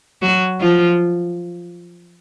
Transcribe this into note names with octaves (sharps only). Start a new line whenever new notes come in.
F#3 F#4
F3 F4